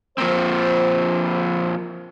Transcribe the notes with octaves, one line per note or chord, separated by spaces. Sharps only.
F3 A#3 C4 C5